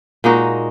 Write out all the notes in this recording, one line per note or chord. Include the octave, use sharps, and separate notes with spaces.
A#2 G#3 D#4 F#4